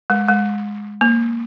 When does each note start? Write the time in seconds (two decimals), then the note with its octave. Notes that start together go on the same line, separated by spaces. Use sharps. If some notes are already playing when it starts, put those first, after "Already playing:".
0.10 G#3
0.28 G#3
1.01 A#3